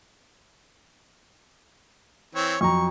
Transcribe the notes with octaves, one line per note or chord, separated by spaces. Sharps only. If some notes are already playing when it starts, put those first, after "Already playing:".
E3 C4 C#5
F2 F#3 A#5 C#6